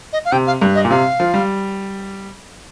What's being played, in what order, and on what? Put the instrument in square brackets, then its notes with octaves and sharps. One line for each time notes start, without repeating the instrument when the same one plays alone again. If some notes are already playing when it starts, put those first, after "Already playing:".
[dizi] D#5
F5
[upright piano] C3 [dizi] G5
[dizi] F5
[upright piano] G2
[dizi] D#5
[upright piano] A#2
[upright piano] C3 [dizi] F5
[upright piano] F3
G3